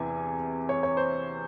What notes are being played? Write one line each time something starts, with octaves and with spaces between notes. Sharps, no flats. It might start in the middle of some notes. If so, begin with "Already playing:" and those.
Already playing: E2 C3 E3 G#5
C#5
C#5
C5